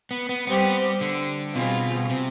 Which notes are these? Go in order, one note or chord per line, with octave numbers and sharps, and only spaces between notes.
B3
B3
G3 B3 C4 G4
D3
B2 G3 C4 F4 G#4
C3